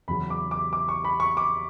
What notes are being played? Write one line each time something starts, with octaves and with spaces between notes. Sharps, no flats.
E2 C#3 F#3 B5
D6
D6
D6
C#6
B5
C#6
D6